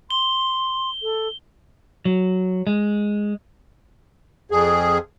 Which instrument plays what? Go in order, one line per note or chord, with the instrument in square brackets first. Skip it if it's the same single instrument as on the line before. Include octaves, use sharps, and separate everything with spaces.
[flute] C6 [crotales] G7
[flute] A4
[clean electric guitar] F#3
G#3
[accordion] F2 G#4